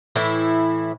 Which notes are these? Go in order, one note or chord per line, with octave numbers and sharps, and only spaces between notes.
A2 E3 E4